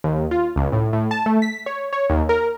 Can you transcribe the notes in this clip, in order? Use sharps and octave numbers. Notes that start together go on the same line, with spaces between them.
D#2
F4
C#2
A2
A2
A5
A3
B6
C#5
C#5
D#2
A#4